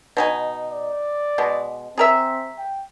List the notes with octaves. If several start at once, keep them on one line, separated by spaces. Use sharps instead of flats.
B2 D#4 G#5
D5
B2 G#3
C4 G#4 A#4 E5
G5